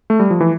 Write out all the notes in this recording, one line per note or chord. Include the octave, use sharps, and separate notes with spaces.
A3
G3
F3
E3